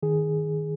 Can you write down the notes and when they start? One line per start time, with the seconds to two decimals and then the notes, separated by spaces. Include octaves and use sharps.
0.03 D#3 G#4